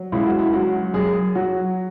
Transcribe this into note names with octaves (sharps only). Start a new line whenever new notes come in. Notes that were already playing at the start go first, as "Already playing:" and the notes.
Already playing: F#3
C#2 E4
F#4
E4
F#3 F#4
F#2 G#4
F#3 F#4